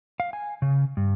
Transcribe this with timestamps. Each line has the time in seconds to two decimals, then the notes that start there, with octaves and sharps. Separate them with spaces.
0.20 F5
0.33 G#5
0.62 C#3
0.97 G2